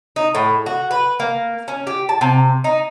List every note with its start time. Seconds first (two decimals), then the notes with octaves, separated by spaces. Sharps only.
0.16 D#4
0.35 A2
0.66 F#4
0.91 B4
1.20 A#3
1.68 C#4
1.87 G4
2.09 A5
2.21 C3
2.64 D#4